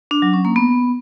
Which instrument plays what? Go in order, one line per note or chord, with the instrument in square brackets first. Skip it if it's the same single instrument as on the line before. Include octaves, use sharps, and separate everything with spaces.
[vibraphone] D4
F#3
C#4
A#3
B3